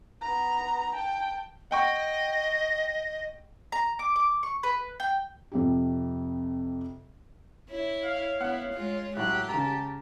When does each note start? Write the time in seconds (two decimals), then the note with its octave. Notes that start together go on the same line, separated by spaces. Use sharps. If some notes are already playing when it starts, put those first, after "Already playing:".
0.21 B3 A#5
0.94 G5 A5
1.71 D#5 F#5 G5 C#6
3.72 A#5
3.99 D6
4.16 D6
4.43 C#6
4.63 B4
5.00 G5
5.52 F2 C3 G4
7.70 E4 C#5
8.05 F5
8.41 B3 E4 F5 F#5
8.73 G#3 F4
9.17 A2 F#3 G4 F#6
9.49 C#3 A5 A#5